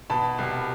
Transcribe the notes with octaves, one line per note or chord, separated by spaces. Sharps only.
B2 A5 B5
C2